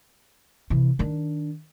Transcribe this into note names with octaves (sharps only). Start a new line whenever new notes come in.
C3 E3
D#3 D4